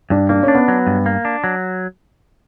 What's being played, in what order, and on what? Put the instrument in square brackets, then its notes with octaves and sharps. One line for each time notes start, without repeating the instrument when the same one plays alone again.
[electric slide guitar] G2 [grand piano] D4
[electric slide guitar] A#3 [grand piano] D4
[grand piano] C#4
[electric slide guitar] D4
[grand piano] B3
[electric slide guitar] F#3
G2
A#3
D4
F#3